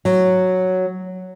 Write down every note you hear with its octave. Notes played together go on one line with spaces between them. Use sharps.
F#3